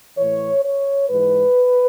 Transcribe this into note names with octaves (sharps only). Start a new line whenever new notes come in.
A2 E3 C#5
C#5
G#2 E3 B4